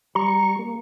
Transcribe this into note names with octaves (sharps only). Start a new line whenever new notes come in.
G3 A#5 C#6
A#3